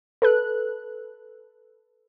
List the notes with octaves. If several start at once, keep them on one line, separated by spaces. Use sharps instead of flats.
A4 B4 F#6